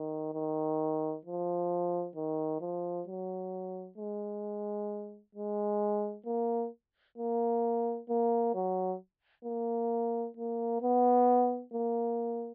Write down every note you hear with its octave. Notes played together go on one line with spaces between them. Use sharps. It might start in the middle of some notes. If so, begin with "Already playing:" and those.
Already playing: D#3
D#3
F3
D#3
F3
F#3
G#3
G#3
A#3
A#3
A#3
F#3
A#3
A#3
B3
A#3